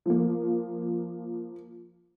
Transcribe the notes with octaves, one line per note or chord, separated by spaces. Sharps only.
F3 A#3